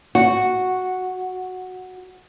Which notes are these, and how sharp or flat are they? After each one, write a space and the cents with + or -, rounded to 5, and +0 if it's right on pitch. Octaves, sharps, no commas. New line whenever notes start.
F#4 -5